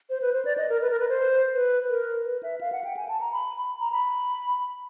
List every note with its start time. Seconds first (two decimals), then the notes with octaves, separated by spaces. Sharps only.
0.10 C5
0.22 B4
0.33 C5
0.45 D5
0.58 D#5
0.69 A#4
0.81 B4
0.90 A#4
1.00 B4
1.09 C5
1.53 B4
1.89 A#4
2.25 B4
2.43 E5
2.61 F5
2.72 F#5
2.84 G5
2.97 G#5
3.09 A5
3.21 A#5
3.32 B5
3.81 A#5
3.92 B5